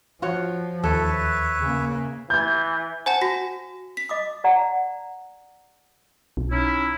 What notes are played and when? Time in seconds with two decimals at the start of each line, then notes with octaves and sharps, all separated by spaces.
0.22 F3 F4 F#4 C#5
0.84 D#2 A4 B4 C#5 E5
1.60 C#3 A#3
2.30 E3 G6 G#6
3.06 C5 F#5 G#5 A5
3.21 F#4 A#6
3.97 B6
4.09 D#5 D6 D#6
4.44 D5 F#5 A#5
6.37 B1
6.51 C#4 D#4 E4